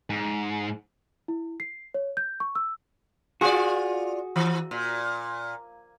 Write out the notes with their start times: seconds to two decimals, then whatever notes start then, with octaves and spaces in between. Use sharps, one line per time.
0.10 G#2
1.28 E4
1.60 C7
1.94 C#5
2.17 G6
2.40 C#6
2.55 E6
3.41 F4 F#4 G#4 D5
4.36 E3
4.71 A#2